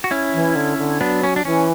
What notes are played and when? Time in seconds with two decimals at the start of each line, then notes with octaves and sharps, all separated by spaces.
0.04 F#4
0.11 C#4 E4
0.33 E3
0.56 D3
0.78 D3
1.01 F#3 B3 D4
1.23 C#4
1.36 D4
1.45 E3 C#4